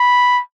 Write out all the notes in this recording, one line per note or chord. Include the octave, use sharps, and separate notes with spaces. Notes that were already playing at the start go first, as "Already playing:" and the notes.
Already playing: B5